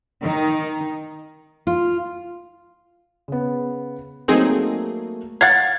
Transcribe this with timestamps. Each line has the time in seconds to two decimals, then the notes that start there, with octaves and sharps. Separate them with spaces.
0.22 D#3 D#4
1.67 F4
3.28 C#3 B3
4.28 F#3 A3 A#3 C4 D#4 G#4
5.41 F5 F#5 G#6 A6